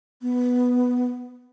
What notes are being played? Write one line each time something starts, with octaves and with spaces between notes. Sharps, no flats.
B3